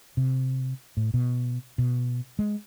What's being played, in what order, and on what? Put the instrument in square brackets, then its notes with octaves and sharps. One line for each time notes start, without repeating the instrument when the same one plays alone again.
[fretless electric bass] C3
A2
B2
B2
G#3